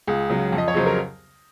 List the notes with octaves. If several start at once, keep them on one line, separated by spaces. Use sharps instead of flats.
C#2 G#4
C#3 F#3
F2
D#5
C#5
C#3 F#3 C5
A#4